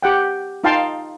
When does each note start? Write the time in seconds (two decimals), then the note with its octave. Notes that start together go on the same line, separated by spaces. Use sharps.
0.02 G4 F#5 G5
0.64 D#4 F4 F5 G5 A5 C6